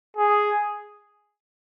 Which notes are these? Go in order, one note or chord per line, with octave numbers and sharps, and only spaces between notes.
G#4